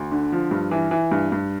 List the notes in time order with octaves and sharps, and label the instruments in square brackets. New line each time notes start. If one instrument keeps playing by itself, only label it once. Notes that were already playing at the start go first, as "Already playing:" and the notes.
Already playing: [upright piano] D2
D3
F3
G2
E3
E3
G2
G2